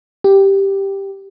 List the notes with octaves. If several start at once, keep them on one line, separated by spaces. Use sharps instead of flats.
G4